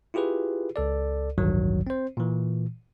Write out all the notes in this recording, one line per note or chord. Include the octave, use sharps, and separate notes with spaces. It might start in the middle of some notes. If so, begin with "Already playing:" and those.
E4 F4 G4 G#4 B4
C#2 A4 D5
A1 D2 G2 D#3 F#3
C4 C5
A#2 E3